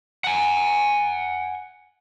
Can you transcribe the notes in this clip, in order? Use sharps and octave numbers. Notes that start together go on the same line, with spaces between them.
F#5 G#5